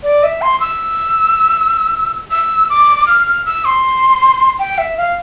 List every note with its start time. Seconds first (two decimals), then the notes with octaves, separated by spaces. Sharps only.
0.03 D5
0.23 E5
0.42 C6
0.60 E6
2.31 E6
2.70 D6
3.07 F6
3.27 F6
3.46 E6
3.65 C6
4.59 G5
4.78 E5
4.98 F5